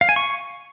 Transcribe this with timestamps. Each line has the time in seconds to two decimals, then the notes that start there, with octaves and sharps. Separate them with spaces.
0.01 F5
0.09 G#5
0.16 C#6